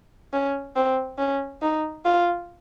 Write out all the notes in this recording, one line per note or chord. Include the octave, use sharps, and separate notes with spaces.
C#4
C4
C#4
D#4
F4